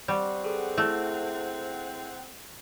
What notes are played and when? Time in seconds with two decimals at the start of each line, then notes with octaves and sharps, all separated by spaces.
0.08 G3 C4 F#5 C#6
0.44 G#4 A4 B4
0.78 A3 E4 G#4 E5